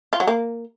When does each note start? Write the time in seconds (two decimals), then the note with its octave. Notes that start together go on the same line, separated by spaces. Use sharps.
0.13 F4
0.20 F#3
0.27 A#3